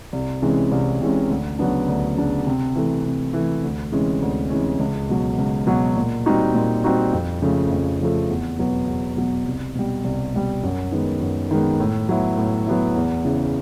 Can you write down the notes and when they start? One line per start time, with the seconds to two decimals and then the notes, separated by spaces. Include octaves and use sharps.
0.13 C2
0.42 C3 E3 G#3 C#4
0.72 C2
1.01 C3 E3 G#3 C#4
1.30 D2
1.59 C#3 F#3 B3 D4
1.88 D2
2.17 C#3 F#3 B3 D4
2.47 C3
2.76 E3 A3
3.04 C3
3.33 E3 A3
3.63 D2
3.92 C3 E3 G#3 C#4
4.22 D2
4.50 C3 E3 G#3 C#4
4.80 C#2
5.09 B2 F#3
5.38 C#2
5.67 B2 F#3
5.96 A#2
6.26 G3 C4 D#4 F#4
6.54 A#2
6.84 G3 C4 D#4 F#4
7.13 F2
7.42 C#3 F3 A3
7.71 F2
8.00 C#3 F3 A3
8.29 E2
8.59 B2 F#3 B3
8.88 E2
9.17 B2 F#3 B3
9.46 C2
9.75 B2 G3
10.04 C2
10.34 B2 G3
10.63 F#2
10.92 D#3 G#3 B3
11.21 F#2
11.51 D#3 G#3 B3
11.80 A2
12.09 F#3 B3 E4
12.37 A2
12.67 F#3 B3 E4
12.96 E2
13.25 C#3 E3